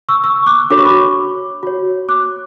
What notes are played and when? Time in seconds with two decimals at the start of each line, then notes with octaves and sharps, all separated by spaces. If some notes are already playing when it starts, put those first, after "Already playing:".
0.09 C#6 E6
0.24 C#6 E6
0.46 D6 F#6
0.70 D4 F#4 A4 C#5 D6
0.78 C#6
0.85 B5 D6
1.63 F#4 C#5
2.09 D6 F#6